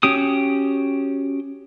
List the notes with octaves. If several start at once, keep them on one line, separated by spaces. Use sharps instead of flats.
C#4 F#4 G4 D#6